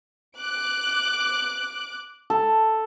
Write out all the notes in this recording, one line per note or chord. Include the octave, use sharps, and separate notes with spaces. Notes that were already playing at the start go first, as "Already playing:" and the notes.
D6 F#6 D7
A4